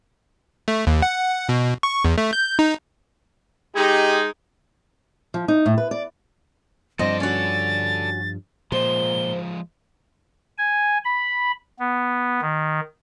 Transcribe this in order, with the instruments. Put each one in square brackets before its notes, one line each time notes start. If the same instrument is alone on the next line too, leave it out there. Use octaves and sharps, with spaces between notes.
[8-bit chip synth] A3
D#2
F#5
B2
C#6
E2
A3
G6
D#4
[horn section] G#3 D#4 [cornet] G4
[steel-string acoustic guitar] F3
D#4
A2
B4
D5
[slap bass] G2 F3 [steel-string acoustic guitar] C4 D#5 [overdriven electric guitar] A4 D5 [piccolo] A#6
[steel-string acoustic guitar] C#4 F#4 [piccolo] A6
[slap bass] A#2 [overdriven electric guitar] F3 G#3 [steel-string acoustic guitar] C5 [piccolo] G7
[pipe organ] G#5
B5
B3
D#3